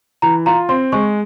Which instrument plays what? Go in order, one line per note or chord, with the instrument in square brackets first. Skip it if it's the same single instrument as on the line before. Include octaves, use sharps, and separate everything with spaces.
[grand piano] E3 [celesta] A#5
[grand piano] F4 [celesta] A#5
[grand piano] C4 [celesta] C6
[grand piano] G#3 [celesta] C#6